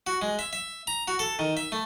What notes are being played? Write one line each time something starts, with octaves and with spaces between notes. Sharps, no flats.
F#4
G#3
E5
E5
A#5
F#4
A4
D#3
E5
A3